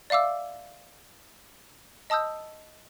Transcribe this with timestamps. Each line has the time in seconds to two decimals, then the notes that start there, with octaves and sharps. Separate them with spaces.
0.10 D5 E5 F5 D6 E6
2.10 D#5 A5 D#6 E6 G6